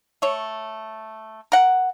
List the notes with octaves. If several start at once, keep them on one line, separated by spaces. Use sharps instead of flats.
A3 C#5
A#4 F#5